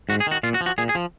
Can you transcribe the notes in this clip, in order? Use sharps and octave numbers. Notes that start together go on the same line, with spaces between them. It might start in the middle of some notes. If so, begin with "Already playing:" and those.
G#2 F#4
G#4
D#3 F#4
A#2 F4
F#4
F3
F#4
A#2 G#4
G#4
F3